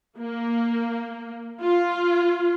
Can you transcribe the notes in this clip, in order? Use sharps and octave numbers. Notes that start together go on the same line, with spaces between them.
A#3
F4